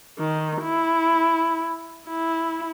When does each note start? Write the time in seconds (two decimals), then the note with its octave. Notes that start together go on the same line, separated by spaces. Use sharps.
0.19 D#3
0.62 E4
2.08 E4